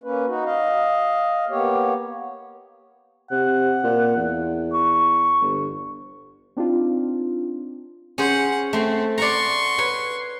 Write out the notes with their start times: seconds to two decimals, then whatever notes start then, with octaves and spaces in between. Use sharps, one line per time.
0.04 A#3 C#4 B4
0.26 D#4 F#4
0.45 D#5 F5
1.50 A#3 B3 G4 C#5
3.31 C3 F#5
3.84 A#2
4.17 E2
4.73 C#6
5.41 G1
6.57 C4 D4 D#4 F4
8.18 C#4 G#4 C5 F#5
8.73 A3 C4 C6
9.18 D5 F#5 A#5 C6 C#6
9.78 B4 C#5